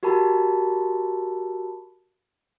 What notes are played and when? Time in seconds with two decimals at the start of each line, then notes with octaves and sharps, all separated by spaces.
0.03 F#4 G4 A#4 A5 B5